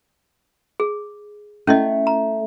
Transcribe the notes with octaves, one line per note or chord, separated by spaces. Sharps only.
G#4
A3 C#4 E4 D#5
A#5